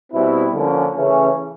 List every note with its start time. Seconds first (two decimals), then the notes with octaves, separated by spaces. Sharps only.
0.12 B2 G3 C4 E4
0.54 D3 F3 A#3 C#4
0.95 C#3 E3 A3 C#4